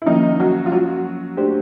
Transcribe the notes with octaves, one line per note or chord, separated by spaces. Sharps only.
E4
D#3 F3 A#3 C#4 D#4
F#3 F#4
F4
F#3 F#4
A3 D4 G4 C5